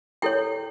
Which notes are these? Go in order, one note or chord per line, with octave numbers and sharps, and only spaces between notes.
E4 A4 C#5 G5